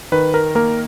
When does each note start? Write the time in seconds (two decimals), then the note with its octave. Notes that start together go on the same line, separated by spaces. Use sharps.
0.12 D#3 B4
0.34 A#4
0.55 A#3 A#4